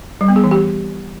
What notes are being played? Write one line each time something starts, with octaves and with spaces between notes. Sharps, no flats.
G3
B3
G#4
E3
G4